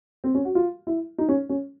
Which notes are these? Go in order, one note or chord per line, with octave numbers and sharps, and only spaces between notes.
C4
C#4
F#4
F4
E4
D#4
C#4
C#4